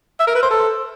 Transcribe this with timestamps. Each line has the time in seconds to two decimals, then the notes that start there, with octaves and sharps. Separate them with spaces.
0.19 E5
0.27 A#4
0.35 B4
0.43 C5
0.50 A4